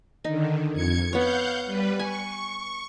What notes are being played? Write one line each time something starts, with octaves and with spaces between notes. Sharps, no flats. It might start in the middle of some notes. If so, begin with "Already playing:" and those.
D3 D#3 D#4
F2 G#6 C#7
B3 C#5 F5 F#5 G6
G3 B4
G#5 C#6